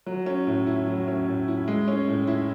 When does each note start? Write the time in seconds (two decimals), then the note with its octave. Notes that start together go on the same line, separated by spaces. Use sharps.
0.06 F#3
0.26 C#4
0.47 A2
0.67 E4
0.87 F#3
1.08 C#4
1.27 A2
1.48 E4
1.68 G#3
1.88 C#4
2.08 A2
2.27 E4